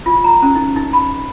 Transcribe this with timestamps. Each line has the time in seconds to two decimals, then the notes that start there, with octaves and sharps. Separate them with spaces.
0.06 F4
0.24 A#5
0.42 C#4
0.56 D#4
0.76 D#4
0.93 B5